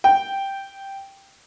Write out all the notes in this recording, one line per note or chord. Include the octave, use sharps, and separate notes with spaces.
G5